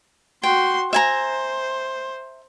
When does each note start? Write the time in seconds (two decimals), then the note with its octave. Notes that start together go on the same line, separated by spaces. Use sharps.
0.43 F#4 G5 C6
0.93 C5 E5 G#5 A#5